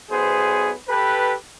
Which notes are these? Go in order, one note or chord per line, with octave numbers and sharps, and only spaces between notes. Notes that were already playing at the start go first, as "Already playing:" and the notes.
B1 B3 G#4 C5
G4 A4 B4